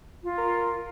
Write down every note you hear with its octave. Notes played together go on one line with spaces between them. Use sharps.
F4
A#4